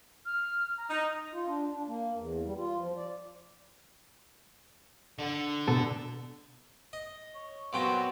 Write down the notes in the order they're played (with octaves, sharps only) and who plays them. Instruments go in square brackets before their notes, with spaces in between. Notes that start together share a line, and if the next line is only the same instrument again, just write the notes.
[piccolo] F6
A#5
[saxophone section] D#4
[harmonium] F4
D4
D4
A#3
E2
G3
F4
F3
D5
[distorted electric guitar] D3
[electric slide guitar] B2 B3 A4
[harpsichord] D#5
[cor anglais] C#5
[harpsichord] A#2 F#3 G5 [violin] B3 F#4 [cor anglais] C4